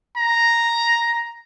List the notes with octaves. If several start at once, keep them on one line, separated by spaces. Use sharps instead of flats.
A#5